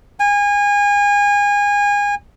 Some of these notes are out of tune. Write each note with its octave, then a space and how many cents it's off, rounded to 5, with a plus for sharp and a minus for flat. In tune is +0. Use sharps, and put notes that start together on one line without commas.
G#5 -30